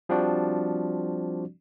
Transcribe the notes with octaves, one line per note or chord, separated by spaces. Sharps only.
F3 G3 C4 D4 F#4 D5